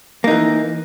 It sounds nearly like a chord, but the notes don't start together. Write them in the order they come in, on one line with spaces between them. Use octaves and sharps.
A#3 D#4 E3